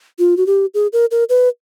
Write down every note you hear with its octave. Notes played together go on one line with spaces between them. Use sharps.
F4
F#4
G4
G#4
A#4
A#4
B4